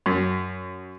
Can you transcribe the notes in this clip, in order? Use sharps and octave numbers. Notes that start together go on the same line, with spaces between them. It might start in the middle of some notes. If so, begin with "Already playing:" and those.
F#2